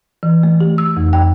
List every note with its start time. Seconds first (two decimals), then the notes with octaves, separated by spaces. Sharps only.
0.23 E3
0.43 A3
0.60 G4
0.78 E6
0.97 F2
1.13 G5